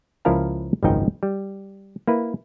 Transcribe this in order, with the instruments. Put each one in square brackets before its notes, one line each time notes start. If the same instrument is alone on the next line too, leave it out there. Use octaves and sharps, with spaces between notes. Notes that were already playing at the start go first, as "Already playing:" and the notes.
[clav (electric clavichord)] C#2 F3 E4 A#4 F5 A5
G#1 C#2 F#2 F3 D#4 G5
G3
A#3 E4 B4